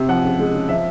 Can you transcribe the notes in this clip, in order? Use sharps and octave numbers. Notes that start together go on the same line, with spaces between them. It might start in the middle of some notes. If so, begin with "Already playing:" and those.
Already playing: C3
F3 F#5
C#3
G#3
C#3
F3 E5